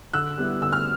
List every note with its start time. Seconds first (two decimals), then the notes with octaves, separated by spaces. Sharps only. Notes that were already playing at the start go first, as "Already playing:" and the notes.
0.13 D3 E6 F#6
0.38 G3 B3 E4
0.62 D3 E6
0.72 F6